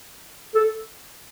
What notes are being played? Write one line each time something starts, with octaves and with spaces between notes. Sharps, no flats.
A4